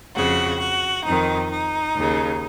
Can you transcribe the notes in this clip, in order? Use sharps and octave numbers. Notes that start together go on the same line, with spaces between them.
F2 C#3 F#4
F#4
F2 D#3 D#4
D#4
D#2 C#3